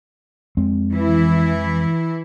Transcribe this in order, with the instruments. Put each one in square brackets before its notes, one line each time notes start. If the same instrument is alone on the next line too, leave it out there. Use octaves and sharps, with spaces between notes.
[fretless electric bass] F2 G#3 C4
[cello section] E3 E4